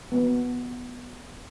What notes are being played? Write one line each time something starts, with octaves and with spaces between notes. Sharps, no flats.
B3